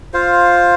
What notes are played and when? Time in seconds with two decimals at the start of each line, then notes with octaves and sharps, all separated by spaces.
0.14 F4 C5 F5